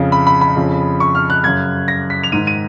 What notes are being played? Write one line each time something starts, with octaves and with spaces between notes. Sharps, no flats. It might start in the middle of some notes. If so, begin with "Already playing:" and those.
Already playing: F2 C#3
B5
B5
B5
F2 C#3
C#6
F6
F#6
F#2 C#3 G#6
A#6
B6
F7
G#2 D#3 D#7
D#7